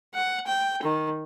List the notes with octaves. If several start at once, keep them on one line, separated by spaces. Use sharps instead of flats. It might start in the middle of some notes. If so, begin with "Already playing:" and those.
F#5
G5
D#3